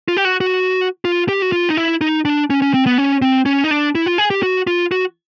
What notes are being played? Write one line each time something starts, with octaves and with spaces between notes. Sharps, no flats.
F4
G4
F#4
F#4
F4
G4
F#4
F4
D#4
E4
D#4
D4
C#4
C#4
C4
B3
C#4
C4
C#4
D#4
D4
E4
F4
G#4
G4
F#4
F4
F#4